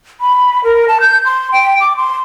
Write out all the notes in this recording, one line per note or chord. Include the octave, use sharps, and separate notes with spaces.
B5
A#4
A5
G6
C6
G5
D6
C6